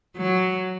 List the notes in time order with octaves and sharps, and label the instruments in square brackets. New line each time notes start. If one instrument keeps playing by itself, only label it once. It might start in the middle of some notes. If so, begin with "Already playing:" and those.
[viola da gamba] F#3